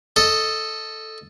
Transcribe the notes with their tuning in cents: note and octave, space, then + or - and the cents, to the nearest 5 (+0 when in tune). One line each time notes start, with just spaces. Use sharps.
A4 +0 D#5 +0